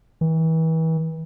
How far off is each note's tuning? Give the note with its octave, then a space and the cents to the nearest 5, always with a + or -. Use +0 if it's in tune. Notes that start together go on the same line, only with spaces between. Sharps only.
E3 -35